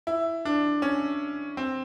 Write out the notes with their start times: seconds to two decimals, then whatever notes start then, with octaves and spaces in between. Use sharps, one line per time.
0.07 E4
0.45 D4
0.82 C#4
1.57 C4